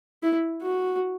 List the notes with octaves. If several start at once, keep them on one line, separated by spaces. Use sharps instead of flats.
E4
F#4